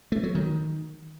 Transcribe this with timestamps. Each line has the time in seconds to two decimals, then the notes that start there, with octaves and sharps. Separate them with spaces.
0.12 A3
0.23 F#3
0.35 D#3